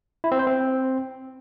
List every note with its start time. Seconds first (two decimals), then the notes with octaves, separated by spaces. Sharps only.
0.24 E4
0.32 C4
0.39 C5
0.47 C4